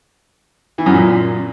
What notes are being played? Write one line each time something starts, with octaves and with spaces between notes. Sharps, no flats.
E3
F#2
A#2